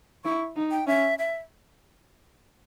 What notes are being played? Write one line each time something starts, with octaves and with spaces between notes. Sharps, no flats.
E4 C#6
D#4
G5
C#4 E5
E5